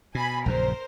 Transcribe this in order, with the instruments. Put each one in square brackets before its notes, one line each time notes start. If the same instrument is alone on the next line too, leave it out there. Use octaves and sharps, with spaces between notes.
[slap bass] B2 [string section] G#5 B5
[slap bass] A#1 F#2 C#3 [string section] A#4 C5